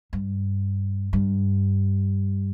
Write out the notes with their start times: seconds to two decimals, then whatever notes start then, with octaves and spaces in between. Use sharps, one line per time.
0.13 G2
1.13 G2